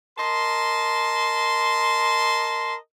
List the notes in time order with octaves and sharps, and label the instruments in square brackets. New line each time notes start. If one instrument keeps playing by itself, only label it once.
[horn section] A#4 D#5 A5 C6